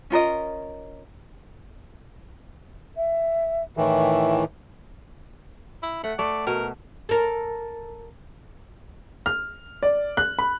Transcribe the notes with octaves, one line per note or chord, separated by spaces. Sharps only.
C#4 F4 A#4 D#5
E5
A2 D#3 E3 E5
E4
A3 F#5
A3 D5
B2 A#4
A4 A#4
F6
D5
F#6
B5